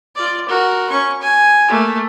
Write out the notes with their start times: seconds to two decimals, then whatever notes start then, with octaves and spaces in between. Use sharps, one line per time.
0.15 F4 D5
0.48 F#4 A#4
0.90 C#4 C#6
1.22 G#5
1.68 A3 A#3